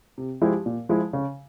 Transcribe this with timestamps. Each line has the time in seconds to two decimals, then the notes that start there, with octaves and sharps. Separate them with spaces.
0.18 C3
0.41 F3 G#3 E4 G4
0.66 A#2
0.89 F3 G#3 E4
1.13 C#3